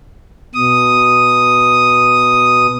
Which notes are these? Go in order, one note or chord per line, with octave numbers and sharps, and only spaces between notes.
B2 D#6